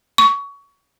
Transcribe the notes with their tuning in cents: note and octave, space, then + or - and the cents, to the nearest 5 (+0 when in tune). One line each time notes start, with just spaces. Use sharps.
C#6 +20